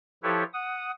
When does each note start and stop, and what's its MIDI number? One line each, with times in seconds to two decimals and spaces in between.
0.23 0.44 53
0.23 0.44 64
0.23 0.44 67
0.23 0.44 69
0.23 0.44 71
0.23 0.44 73
0.53 0.91 78
0.53 0.91 87